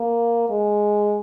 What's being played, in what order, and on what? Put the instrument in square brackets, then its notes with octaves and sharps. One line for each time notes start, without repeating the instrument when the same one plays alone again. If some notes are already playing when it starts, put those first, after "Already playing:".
Already playing: [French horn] A#3
G#3